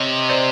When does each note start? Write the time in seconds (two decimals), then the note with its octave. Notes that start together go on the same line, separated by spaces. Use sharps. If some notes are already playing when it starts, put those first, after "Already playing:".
Already playing: C3 C#5 D#5
0.29 C5 D5